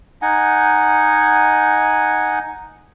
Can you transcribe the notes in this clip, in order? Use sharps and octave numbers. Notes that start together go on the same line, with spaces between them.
D#4 F#5 G#5